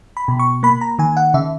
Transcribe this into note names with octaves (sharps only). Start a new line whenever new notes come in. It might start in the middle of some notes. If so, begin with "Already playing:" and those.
B5
B2
C#6
A#3 B5
A#5
D#3 G#5
F#5
C#3 E5